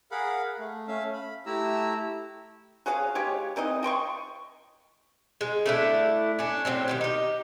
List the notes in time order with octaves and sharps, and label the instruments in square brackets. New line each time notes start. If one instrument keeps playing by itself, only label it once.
[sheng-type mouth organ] G#4 A#4 F5 F#5 B5
A3
A3 C#4 E5 F5
B5
A3 E4 G4 A#5 E6
[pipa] F#4 G#4 C#5 F5
G#3 G4 C#5
E3 C4 D#4 D#5
D#5 G5 C6 C#6
[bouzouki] G#3
A3 D4 E4
C#4 D4
A2 C#3 F#3 C4
D#3 G3 G4
D#4 G4